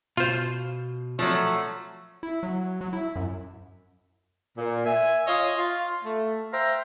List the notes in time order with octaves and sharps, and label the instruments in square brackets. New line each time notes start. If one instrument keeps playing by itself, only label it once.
[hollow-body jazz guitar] B2 [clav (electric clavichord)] F4 C5
[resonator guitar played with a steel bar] F3 F#3 [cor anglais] A3
[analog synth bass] E4
F#3
F#3
E4
F#2
[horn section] A#2
E5 G#5
F4 C#5 D#5
F4
A3
C5 E5 F5 G5 A#5